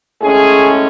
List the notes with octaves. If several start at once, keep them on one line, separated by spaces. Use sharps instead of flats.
A2 G#3 C#4 G#4